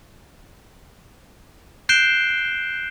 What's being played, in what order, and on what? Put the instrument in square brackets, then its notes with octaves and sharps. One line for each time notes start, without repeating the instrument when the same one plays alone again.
[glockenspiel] F#6 G6 C7 D7 E7 G7